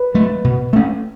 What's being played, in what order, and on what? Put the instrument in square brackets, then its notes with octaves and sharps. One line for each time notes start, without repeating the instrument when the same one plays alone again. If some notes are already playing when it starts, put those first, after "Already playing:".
Already playing: [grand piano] B4
[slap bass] F#3 A3
B2
A3 C#4